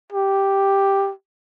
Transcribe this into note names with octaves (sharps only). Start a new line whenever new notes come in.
G4